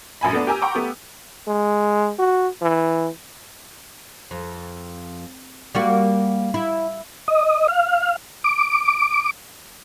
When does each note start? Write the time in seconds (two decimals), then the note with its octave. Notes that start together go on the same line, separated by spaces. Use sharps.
0.21 A#1 F#2 G#5 B5
0.33 A3 B3 D4
0.47 G4 A#4 G#5 A#5 E6
0.62 F#5 G5 A#5 B5 C#6 D6
0.75 A3 B3 G4
1.48 G#3
2.19 F#4
2.62 E3
4.31 F2
5.75 G3 A#3 F#4
6.54 E4
7.28 D#5
7.68 F5
8.44 D6